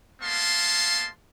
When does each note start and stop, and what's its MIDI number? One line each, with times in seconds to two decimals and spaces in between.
0.22 1.09 56
0.22 1.09 58
0.22 1.09 59
0.22 1.09 77
0.22 1.09 81
0.22 1.09 84